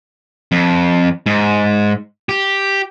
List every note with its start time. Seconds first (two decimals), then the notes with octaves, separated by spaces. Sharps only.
0.52 F2
1.26 G#2
2.29 G4